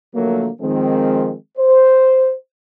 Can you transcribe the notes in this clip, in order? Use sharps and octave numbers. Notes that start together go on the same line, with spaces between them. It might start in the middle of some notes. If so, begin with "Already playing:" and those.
D3 F3 F#3 A3 A#3
D#3 F3 G#3 C4
C5